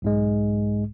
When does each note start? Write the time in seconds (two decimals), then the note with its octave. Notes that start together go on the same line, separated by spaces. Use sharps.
0.02 B1 G#2 G#3